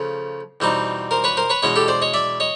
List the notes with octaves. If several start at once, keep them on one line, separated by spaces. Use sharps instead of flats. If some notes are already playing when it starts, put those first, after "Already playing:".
Already playing: C#3 F3 A3
E2 B2 G3 C4 D#4
A#4 C5
B4 C#5
A#4 C5
B4 C#5
E2 B2 G#3 C#4 C#5 D#5
G4 A4
C5 D5
C#5 D#5
D5 E5
C#5 D#5